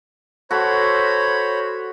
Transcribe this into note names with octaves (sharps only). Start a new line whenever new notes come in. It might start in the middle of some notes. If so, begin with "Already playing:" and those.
F#4 A4 C5 C#5 B5